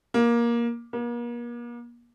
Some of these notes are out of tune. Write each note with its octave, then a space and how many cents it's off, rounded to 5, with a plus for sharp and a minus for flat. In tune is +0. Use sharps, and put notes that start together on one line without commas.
A#3 +15
A#3 +40